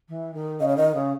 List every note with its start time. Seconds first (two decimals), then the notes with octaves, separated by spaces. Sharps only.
0.09 E3
0.34 D#3
0.60 C#3 D#5
0.68 C#5
0.77 D#3 D#5
0.94 C#3